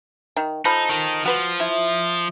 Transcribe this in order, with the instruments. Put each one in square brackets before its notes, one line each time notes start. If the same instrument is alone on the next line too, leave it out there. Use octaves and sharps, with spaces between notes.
[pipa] D#3
[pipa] F3 A4 B5 [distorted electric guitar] D#4
[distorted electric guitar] D#3 D#4
[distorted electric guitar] F3 [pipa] F#4 B4
[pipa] E4